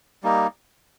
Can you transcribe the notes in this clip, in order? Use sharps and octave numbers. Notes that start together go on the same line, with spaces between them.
G3 A#3 D#4